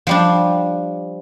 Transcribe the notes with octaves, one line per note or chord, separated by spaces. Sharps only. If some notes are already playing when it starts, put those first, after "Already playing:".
F3 G3 D4